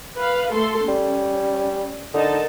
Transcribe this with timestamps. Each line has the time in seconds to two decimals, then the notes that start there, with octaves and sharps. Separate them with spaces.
0.16 B4 F5
0.52 A3 A4 C6
0.88 G3 C#4
2.14 D3 D#4 A#4 A5